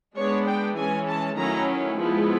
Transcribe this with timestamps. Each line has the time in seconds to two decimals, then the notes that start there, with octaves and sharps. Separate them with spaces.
0.17 G#3 B3 D4 C#5
0.47 G5
0.77 E3 G#3 C#4 G#5
1.08 A5
1.38 D#3 F#3 A3 C#4 E4 A#5
1.98 F3 G#3 B3 E4